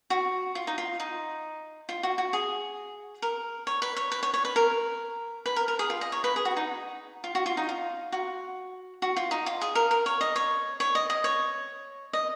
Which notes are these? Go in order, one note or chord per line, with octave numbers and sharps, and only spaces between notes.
F#4
F4
D#4
F4
D#4
F4
F#4
F#4
G#4
A#4
C#5
B4
C#5
B4
C#5
C#5
B4
A#4
B4
A#4
A#4
G#4
F4
D#5
C#5
B4
G#4
F#4
D#4
F4
F#4
F4
D#4
F4
F#4
F#4
F4
D#4
F4
G#4
A#4
A#4
C#5
D#5
C#5
C#5
D#5
D#5
C#5
D#5